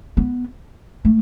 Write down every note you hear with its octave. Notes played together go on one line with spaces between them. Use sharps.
B3
A3